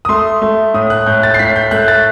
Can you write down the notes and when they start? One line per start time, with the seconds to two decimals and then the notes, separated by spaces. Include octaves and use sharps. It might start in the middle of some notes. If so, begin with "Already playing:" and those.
0.05 D#6
0.09 A3 C6
0.42 A3
0.74 A2 D#6
0.90 F#6
1.06 A2 G6
1.23 A6
1.34 C7
1.39 A2 B6
1.56 G6
1.71 A3 F#6
1.88 A6